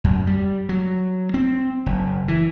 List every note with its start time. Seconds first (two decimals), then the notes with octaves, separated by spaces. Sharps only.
0.04 F#2
0.27 G3
0.69 F#3
1.34 C4
1.86 F#1
2.28 E3